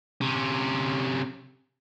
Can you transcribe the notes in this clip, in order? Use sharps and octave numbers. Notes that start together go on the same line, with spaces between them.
C3 C#4